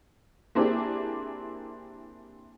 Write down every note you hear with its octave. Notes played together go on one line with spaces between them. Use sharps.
A#3 C4 D4 E4 G4 G#4